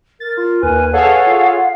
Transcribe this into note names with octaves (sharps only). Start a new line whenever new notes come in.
A#4 A6
F4
D#2 B4 G#5
G#4 A4 C#5 F5 F#5
F4